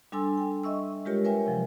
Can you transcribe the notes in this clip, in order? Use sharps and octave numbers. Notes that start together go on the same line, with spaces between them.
G3 D4 A4 G#5 C6 E6
G5
D#5 E5 C#6 E6
G#3 F4 G4 A#4 C#5
A#4 B4 C#5 E5 G5 G#5
C3 F3 F#3